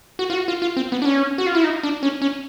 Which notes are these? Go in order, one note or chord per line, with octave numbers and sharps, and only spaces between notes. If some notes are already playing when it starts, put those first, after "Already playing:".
F#4
F4
F#4
F4
F4
C4
B3
D4
C#4
F#4
F4
E4
D#4
D4
C#4
C#4